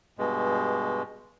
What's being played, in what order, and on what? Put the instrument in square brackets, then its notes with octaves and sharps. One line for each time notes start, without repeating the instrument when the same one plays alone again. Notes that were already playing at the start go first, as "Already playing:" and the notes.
[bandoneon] G2 B2 G#3